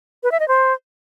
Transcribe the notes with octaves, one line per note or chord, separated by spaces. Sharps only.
B4
E5
D#5
C5